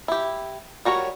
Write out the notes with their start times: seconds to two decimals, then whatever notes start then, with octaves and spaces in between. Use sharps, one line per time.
0.08 E4 G4
0.85 G3 F#4 A#4 C#5